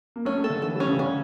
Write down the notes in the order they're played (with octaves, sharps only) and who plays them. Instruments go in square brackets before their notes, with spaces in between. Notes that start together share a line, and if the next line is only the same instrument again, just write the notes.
[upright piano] A#3
[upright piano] A3 [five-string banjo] C#4
[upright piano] A3
[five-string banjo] A4
[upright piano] D3
[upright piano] E3 [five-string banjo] A4
[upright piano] G3
[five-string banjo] C#4
[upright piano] C#3
[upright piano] D3 [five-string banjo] C#4